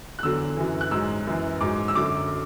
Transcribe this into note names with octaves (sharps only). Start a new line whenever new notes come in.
F#6
E2 D3 F#3 E6
F#2 E3
F#6
G#2 F#3 E6
F#2 E3
G#2 F#3 D6
E6
F#2 D3 F#3 D6